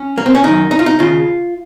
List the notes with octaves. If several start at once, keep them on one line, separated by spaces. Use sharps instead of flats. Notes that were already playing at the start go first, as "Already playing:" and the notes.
Already playing: C#4
A#3
C4
C#4
F#2 D#3 D#4
D#4
F4
D#4
D#2 C#3 F4